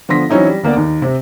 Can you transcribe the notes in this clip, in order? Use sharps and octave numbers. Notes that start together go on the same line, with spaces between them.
D3 F3 B3 C6 A#6 B6
E3 F#3 C4 C#4 D#4 E4
G3
D2 A#3 B3 D5
D#2 D#4
C3 C4